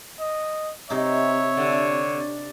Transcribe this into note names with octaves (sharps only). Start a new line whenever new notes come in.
D#5
C3 D#4 C#5 E5
D3